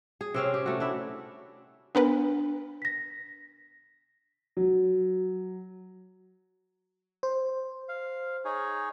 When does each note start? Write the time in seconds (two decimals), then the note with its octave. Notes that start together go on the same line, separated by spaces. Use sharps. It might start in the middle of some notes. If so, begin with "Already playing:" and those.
0.21 G#4
0.34 C3 C4 C#4
0.54 G4
0.66 A3 F#4
0.80 D4 E4 E5
1.95 B3 D4 A#4 B4
2.82 A#6 B6
4.57 F#3
7.23 C5
7.89 F5
8.45 D#4 G#4 C#5